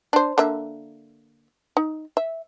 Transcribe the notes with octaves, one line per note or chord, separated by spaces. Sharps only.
D4 C5
D3 A#3 E5
D#4
E5